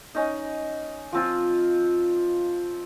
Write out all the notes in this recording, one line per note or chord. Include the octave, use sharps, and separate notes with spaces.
C#4 D#4
F3 C4 F4